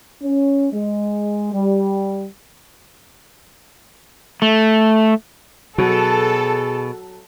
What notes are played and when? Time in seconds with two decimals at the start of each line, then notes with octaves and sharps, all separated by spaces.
0.22 C#4
0.73 G#3
1.53 G3
4.42 A3
5.78 B2 F#3 G#4 A4